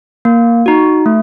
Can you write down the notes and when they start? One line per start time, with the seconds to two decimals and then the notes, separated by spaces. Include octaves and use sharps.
0.25 A#3
0.66 D#4 F#4
1.06 A3